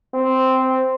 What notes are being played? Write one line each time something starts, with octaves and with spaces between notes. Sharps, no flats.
C4